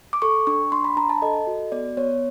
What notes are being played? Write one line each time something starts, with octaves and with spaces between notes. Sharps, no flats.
D6
A4 C#6
D4 C#6
D4 C6
B5
D4 A#5
A5
A4 D#5
F#4
B3 D5
B3 C#5